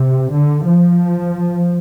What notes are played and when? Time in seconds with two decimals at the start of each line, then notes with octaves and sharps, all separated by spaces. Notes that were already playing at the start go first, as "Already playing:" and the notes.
Already playing: C3
0.33 D3
0.68 F3